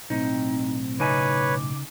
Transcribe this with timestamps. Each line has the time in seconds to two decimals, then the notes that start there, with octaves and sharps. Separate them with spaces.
0.10 B1 A2 C4 D#4
1.00 C#3 D#4 B4 C#5 G#5 D6